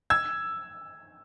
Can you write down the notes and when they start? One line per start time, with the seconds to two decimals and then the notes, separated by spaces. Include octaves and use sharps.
0.10 E6 G#6